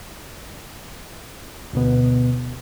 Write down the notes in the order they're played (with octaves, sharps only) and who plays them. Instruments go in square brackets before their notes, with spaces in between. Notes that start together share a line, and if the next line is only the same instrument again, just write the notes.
[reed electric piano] D2 B2 B3